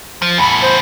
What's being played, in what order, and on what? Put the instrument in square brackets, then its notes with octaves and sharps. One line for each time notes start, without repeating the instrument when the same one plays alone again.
[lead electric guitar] F3
[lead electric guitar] E2 A2 [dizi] B5
[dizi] C5